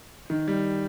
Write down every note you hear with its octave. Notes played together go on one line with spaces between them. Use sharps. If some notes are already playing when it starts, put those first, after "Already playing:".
D#3
G3